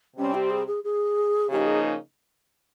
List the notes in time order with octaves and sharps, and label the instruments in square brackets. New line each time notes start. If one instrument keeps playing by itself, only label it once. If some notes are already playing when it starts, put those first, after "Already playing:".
[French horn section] C3 G3 C4 [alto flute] C#4
[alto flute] G4
G#4
G#4
G#4
[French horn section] C#3 F3 A#3 D#4 [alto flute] G4
[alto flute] G#4